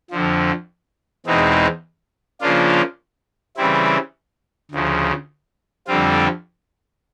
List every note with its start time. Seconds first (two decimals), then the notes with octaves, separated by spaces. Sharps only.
0.11 F2 D3 F3
1.26 E2 B2 G#3 C4 D#4
2.41 C#3 F3 A#3 D4 F4
3.57 C#3 E3 G3 C4 E4
4.72 D2 C#3 F3
5.87 F2 D3 G3 C4 F4